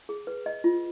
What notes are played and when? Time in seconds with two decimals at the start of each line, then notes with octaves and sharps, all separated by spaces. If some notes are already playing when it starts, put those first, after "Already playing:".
0.09 G#4
0.27 B4
0.46 D#5
0.64 F4